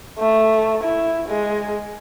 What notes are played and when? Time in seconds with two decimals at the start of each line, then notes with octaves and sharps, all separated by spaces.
0.18 A3
0.83 E4
1.28 G#3